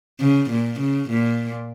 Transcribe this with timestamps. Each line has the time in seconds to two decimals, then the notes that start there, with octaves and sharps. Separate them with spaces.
0.20 C#3
0.50 A#2
0.80 C#3
1.09 A#2